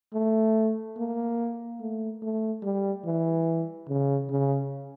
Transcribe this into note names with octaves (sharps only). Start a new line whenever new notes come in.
A3
A#3
A3
A3
G3
E3
C#3
C#3